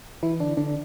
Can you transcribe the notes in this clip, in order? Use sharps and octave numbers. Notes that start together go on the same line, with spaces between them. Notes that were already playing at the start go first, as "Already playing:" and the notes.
E3 E4
D3 D4
D3 D4